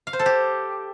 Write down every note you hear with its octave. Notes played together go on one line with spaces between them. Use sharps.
F5
C5
A4
G4